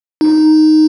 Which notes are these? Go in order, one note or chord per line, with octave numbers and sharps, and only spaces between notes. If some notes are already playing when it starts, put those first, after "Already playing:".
D#4